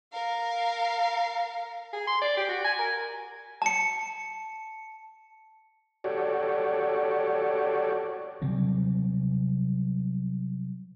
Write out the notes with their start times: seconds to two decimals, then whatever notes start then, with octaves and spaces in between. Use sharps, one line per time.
0.13 A#4 F5
1.93 G#4
2.07 C6
2.22 D5
2.37 G4
2.49 F#4
2.65 G#5
2.79 A#4
3.62 A5 C#7
6.04 F#4 G4 A4 C#5 D5
8.42 C3 F#3 G3 C4